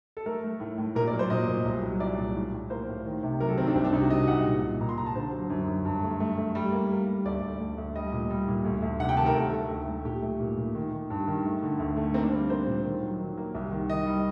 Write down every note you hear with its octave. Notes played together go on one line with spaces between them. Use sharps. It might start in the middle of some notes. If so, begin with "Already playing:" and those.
A4
A3 A#4
A3
A2
A2
A#2 A#4
D5
F#3
C5
A#2 D#5
A#2
C2
F#3
C2 D5
A#2
A2
A2
A#3 C5
A2
D#3
C3
F#3 A#4
A4
D#3 C4
D4
C2 C4
D4
C3 D#4
F#4
C3 D#5
C2 F#5
A#2
A#2
A#2 A#5
C6
A#2 A#5
A5
D3 C5
F#3
F#2
F#2
G2
A3
A3
A3
G3
A#3
A#3
G3
D2 D5
D2
D2
D2
G3 D#5
A#2
G3
A#2
D2
D2
C3 F#5
G5
D#3 A5
A#4
D2 A4
A3
D2
A3
A#2 G4
A3
A#2
A#2
D#3
D#3
G2
D#3
A3
D3
D2
A3
A#3 C4
D4
G3 C4
A#3 C5
A#2
D#3
F#3
D#3
A#3
C2
D#3
D#3 D#5
G3